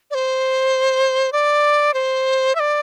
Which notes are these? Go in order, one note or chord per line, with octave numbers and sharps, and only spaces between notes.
D5
C5
D5
C5
E5
D5